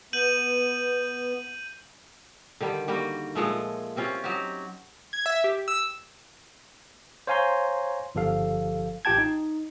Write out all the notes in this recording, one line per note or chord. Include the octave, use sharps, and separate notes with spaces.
B3 G6 D#7 F#7
D3 D#3 G3
G3 A#3 F#4
A#2 F3 G#3 A3
G3 C4 C#4 F4
F#3 D#4 F#4 G4
G#6
E5
G4
E6
C5 C#5 F5 G#5 A#5 C6
G1 F3 G4 A4 F5
A1 F4 G4 G5 A5 G#6
D#4